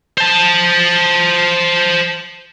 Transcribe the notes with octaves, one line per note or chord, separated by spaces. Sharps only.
C5 A5